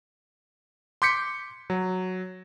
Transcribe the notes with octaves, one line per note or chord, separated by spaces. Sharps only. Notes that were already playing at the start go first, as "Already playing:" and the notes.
C6 D6 G6 B6 C#7
F#3